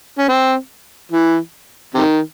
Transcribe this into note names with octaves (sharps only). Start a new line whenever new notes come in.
C#4
C4
E3
C3 D#3